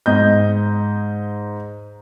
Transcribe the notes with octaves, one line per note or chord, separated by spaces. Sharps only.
G#2 D#5 G6